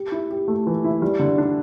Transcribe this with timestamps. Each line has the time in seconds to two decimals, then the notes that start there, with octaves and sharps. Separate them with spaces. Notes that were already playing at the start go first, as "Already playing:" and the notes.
Already playing: G4
0.12 E4
0.31 G4
0.48 A3
0.67 E3
0.84 E4
1.02 G3
1.19 D3
1.38 D4